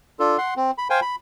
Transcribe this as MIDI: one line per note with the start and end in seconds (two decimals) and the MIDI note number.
0.20 0.37 62
0.20 0.37 65
0.20 0.37 69
0.38 0.54 78
0.38 0.54 84
0.56 0.71 60
0.78 0.88 83
0.90 1.00 72
0.90 1.00 77
0.90 1.00 79
0.90 1.00 80
1.02 1.16 83